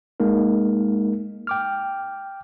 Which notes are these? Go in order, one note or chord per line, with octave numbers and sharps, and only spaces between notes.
G#3 A#3 D#4 A#4
G5 D6 F6